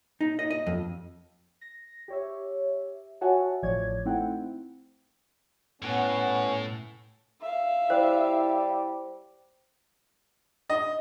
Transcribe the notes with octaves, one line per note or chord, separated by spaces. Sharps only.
D#4
D#5
D#5
F2
A#6
G4 C#5 E5
F#4 C#5 E5 F#5 G#5 A5
A1 A2 F3 C#5 D5 G#6
A3 C4 D#4 E4 F#5 G5
A2 B3 C#4 F#5
E5 F5
G3 E4 C5
D#5